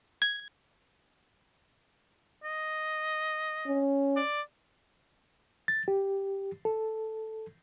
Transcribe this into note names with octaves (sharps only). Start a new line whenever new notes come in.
G#6
D#5
C#4
D5
A6
G4
A4